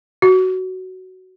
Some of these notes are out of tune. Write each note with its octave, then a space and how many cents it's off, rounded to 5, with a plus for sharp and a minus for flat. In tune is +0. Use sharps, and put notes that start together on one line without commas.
F#4 +10